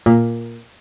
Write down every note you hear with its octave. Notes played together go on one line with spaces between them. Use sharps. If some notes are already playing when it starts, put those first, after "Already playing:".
A#2